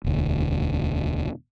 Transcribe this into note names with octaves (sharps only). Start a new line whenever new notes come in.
E1 D2